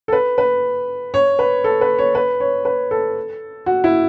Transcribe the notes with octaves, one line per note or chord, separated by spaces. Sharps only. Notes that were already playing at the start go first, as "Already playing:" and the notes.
A4
B4
B4
C#5
B4
A4
B4
C#5
B4
C#5
B4
A4
F#4
E4